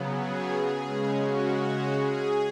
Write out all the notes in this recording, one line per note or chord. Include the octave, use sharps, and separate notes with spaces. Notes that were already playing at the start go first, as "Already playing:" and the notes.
Already playing: C#3 F#3 B3
G#4
C#3 G#3 C#4
F#4
F#4
G#4